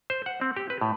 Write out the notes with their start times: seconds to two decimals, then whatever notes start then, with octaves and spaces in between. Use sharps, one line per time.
0.10 C5
0.26 F#5
0.41 C4
0.57 G4
0.70 B4
0.81 A2